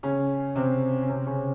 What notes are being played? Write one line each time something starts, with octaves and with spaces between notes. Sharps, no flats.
C#3 C#4
C3 C4
C#4
C3 C4
C#3 C#4